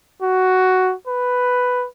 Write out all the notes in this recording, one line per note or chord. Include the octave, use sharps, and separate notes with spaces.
F#4
B4